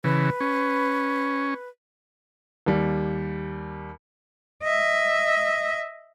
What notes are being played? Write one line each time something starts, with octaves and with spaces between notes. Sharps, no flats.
C#3 E3 B4
C#4
D#2 G3
D#5 E5